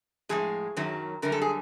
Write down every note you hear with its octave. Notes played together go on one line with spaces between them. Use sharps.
A2 F3 G#3 G#4
F#2 D#3 F#3
F#2 D3 G3 A#4
A4
G#4